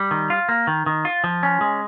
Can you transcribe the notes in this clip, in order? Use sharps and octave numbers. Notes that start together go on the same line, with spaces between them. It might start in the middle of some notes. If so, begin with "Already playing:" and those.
Already playing: G3
D#3
F4
A#3
D#3
D#3
F4
F3
C#4
G#3